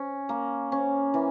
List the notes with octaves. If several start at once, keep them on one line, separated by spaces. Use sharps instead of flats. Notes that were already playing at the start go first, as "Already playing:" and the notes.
Already playing: C#4
A#3
C#4
E3